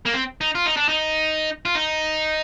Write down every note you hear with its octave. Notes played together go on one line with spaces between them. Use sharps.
A#3
C4
D#4
F4
D#4
D4
D#4
F4
D#4